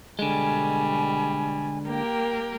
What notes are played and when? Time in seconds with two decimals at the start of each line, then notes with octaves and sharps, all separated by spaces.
0.19 B2 D3 G3 G#3 G#5
1.87 A#3 G4 A#4 G5